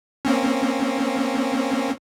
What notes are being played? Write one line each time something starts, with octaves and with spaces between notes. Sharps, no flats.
A#3 C4 C#4